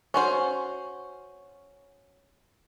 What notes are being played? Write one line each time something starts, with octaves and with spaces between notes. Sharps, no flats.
C#4 F#4 C5